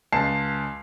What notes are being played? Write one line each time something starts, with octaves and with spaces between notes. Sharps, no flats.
C#2 A5 C7